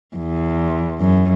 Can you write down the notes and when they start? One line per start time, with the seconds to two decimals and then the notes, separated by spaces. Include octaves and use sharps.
0.16 E2
1.00 F#2